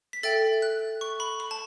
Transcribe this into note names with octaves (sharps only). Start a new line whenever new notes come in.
B6
A4 E5 G5 A6
F#6
C#6
B5
B5
A5